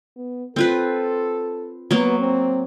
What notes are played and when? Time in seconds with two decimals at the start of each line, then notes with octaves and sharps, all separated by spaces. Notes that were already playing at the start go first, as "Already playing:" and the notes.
0.16 B3
0.56 C4 F4 A4 B4
1.91 F#3 A#3 B3
2.19 C4